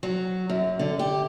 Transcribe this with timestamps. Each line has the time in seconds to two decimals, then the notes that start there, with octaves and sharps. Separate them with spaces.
0.03 F#3
0.49 F#2
0.79 D3
0.99 G4